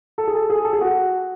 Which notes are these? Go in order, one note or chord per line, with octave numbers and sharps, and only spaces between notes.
A4
G#4
A4
G#4
A4
G#4
F#4